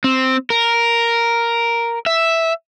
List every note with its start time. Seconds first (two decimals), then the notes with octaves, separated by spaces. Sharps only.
0.04 C4
0.50 A#4
2.06 E5